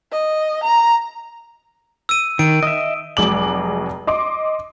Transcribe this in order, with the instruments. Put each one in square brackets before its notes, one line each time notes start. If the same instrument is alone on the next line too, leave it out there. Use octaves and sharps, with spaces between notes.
[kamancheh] D#5
A#5
[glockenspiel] E6 D#7
[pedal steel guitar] D#3 [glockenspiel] D7
[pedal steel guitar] D#5 E5
[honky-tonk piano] F1 F#3 G#3 D6 F#7
D#5 C6 D6